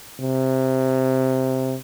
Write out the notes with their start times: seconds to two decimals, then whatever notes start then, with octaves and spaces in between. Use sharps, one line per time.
0.20 C3